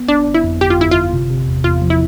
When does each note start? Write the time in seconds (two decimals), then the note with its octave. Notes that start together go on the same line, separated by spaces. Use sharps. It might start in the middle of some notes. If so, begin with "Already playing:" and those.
Already playing: B3
0.08 G1 D4
0.27 G1
0.34 E4
0.44 F2
0.60 G1 G4
0.70 F4
0.79 G1 E4
0.91 G1 F4
1.13 C3
1.30 C3
1.47 E2
1.64 E2 F4
1.82 F3
1.90 E4